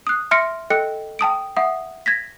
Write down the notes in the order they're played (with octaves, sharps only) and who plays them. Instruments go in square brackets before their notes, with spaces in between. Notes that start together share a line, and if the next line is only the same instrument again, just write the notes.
[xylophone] D#6 F#6
E5 C6 F6 A#6 C#7 D7
A4 D#5 G5 F#6 C#7
G5 A5 D#6 D7
E5 F#5 D#6
G#6 A#6 B6